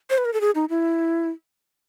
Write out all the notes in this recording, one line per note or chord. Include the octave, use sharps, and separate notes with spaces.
C5
B4
A#4
A4
G#4
D#4
E4